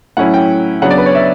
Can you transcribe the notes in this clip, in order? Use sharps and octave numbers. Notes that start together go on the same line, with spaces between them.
A2 F#3 C#4 E4 F#5
G5
C#3 F#3 B3 D4 F#5
D5
B4
C#5
E5